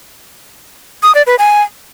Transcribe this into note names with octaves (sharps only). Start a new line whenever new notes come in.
D#6
D5
B4
G#5